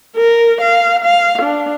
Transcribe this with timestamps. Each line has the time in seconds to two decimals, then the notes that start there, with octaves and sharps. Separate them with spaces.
0.16 A#4
0.61 F5
1.04 F5
1.42 D4